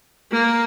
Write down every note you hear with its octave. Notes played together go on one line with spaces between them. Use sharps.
A#3